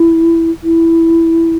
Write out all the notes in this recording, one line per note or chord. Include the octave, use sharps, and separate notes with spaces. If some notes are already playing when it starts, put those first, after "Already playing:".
Already playing: E4
E4